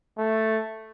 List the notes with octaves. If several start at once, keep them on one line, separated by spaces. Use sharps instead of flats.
A3